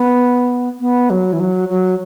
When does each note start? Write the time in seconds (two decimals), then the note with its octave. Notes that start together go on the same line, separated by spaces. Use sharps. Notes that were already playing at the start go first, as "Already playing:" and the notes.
Already playing: B3
0.80 B3
1.10 F#3
1.33 E3
1.40 F#3
1.69 F#3